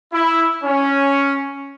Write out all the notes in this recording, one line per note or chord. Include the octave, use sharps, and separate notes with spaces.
E4
C#4